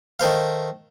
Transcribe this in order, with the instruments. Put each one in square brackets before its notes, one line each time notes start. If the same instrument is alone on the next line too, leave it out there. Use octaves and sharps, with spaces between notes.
[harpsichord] D#3 A3 C5 F5